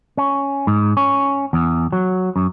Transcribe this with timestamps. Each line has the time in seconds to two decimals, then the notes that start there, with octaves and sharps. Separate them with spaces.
0.17 C#4
0.67 G#2
0.97 C#4
1.53 E2
1.92 F#3
2.36 F#2